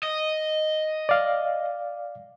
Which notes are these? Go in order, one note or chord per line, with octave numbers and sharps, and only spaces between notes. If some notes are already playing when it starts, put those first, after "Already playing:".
D#5
D5 F5